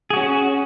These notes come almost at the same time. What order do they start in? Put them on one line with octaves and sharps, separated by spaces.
G#4 F#4 C#4